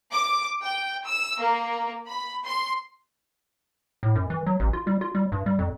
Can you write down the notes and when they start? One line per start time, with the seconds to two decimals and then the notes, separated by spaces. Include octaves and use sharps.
0.12 D6
0.62 G5
1.05 E6
1.40 A#3
2.07 B5
2.44 C6
4.03 A2
4.15 F#2
4.30 E3
4.46 F#3
4.60 A1
4.73 F4
4.87 G3
5.01 F4
5.15 G3
5.32 G2
5.46 G3
5.59 F2